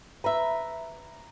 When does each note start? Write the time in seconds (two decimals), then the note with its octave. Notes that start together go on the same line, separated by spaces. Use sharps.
0.24 B4 E5 A#5